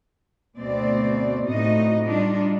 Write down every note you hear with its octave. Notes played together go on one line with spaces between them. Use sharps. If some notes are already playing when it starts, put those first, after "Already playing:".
D2 B2 C4 D5
A2 C3 D#4 F#4 D#5
G3 D4 D#4 F4